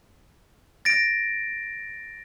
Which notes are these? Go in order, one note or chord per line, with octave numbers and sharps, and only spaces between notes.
A6 A#6 D7